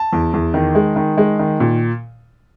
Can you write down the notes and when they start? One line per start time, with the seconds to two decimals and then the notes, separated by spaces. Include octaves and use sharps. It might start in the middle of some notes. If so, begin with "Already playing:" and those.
Already playing: A5
0.13 E2
0.34 E2
0.54 D#3
0.75 G#3
0.96 D#3
1.18 G#3
1.39 D#3
1.60 A#2